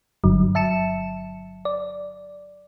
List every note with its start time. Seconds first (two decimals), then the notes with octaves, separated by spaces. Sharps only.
0.24 G1 G2 D3 F#3
0.55 E5 A5 C#7 E7
1.65 D5